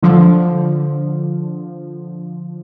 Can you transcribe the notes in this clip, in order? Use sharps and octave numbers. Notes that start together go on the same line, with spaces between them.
D3 F3